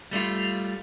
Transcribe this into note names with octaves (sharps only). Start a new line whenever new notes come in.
G3 A3 E4 F4